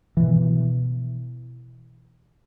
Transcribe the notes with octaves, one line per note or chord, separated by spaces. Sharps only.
B2 E3